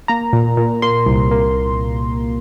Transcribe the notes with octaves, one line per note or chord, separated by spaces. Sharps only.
A#3 A#5
A#2
A#2
A#3 C6
C2
A#3